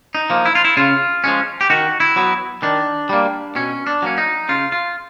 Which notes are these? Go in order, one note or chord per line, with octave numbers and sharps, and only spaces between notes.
D#4
F3 A#3
E4
F4
E4
C#3 F4
F3 G#3 C#4
G4
D#3 F#4
E4
F#3 B3
D#3 D4
G3 A#3
B2 C#4
D4
F#3 A#3 C#4
D#4
C#3 F4
F4